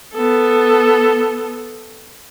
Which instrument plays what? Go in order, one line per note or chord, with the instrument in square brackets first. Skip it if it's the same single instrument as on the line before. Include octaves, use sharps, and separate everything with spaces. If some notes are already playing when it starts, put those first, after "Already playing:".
[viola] B3 A4